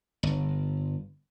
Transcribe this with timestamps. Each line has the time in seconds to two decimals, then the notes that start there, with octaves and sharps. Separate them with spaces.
0.23 G1